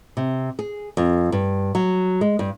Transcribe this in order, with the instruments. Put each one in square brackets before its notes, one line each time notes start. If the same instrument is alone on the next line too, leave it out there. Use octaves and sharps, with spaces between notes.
[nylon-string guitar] C3
G#4
F2
G2
F#3
G#3
G2